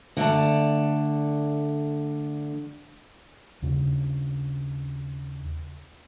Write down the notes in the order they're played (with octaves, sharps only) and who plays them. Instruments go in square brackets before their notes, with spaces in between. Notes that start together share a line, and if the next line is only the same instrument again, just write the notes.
[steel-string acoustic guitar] D3 A3 D5 A5
[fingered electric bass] D#2 C#3